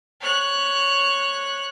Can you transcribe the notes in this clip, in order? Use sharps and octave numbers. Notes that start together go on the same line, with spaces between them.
C#5 F#6